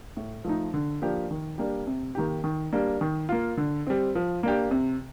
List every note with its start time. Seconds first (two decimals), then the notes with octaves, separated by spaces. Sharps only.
0.17 A2
0.44 F3 A3 D#4
0.74 D3
1.02 F3 A#3 D4 G4
1.31 D#3
1.58 G3 A#3 D4 G4
1.87 C3
2.15 D#3 A#3 D#4 G4
2.44 D#3
2.73 G3 A#3 D4
3.01 D#3
3.29 A#3 F4
3.57 D3
3.87 G3 C4
4.15 F3
4.43 A#3 D4 G4
4.71 C3